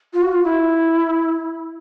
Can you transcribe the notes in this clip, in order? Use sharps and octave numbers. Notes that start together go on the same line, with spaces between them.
F4
F#4
F4
E4